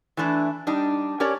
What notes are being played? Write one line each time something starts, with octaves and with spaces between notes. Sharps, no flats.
E3 A3 D4 E4
G3 D4 D#4
C#4 G4 A#4 C#5 D5